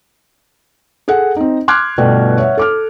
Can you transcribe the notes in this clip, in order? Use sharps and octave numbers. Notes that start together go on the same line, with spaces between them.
G#4 A4 F#5
C4 D#4
C6 D6 F6 F#6 G#6
G1 B2 A3 D5 G5
C#5 E5 F#5
A4 D6 F6